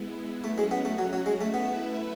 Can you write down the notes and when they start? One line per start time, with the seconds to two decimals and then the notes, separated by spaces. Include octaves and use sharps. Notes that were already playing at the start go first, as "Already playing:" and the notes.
Already playing: G#3 B3 E4
0.44 F#3 A3 C#4 F#4
0.58 G#3
0.71 B3
0.85 A3
0.98 F#3
1.13 F#3
1.26 G#3
1.41 A3
1.54 A3 B3 E4 B4 E5